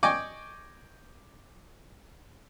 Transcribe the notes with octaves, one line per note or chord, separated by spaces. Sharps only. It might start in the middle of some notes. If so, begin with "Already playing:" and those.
D5 D#5 G5 G#5 C#6 D6